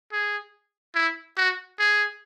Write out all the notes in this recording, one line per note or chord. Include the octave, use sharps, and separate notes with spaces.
G#4
E4
F#4
G#4